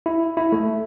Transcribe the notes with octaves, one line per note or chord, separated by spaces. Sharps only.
E4
E4
A3